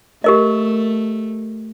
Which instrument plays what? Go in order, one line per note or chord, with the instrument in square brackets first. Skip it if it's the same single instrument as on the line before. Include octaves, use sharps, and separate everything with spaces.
[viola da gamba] A3 [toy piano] G4 A#4 D#5